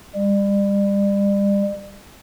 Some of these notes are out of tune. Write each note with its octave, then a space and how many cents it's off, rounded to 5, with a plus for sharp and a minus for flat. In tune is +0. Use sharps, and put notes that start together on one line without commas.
G3 +35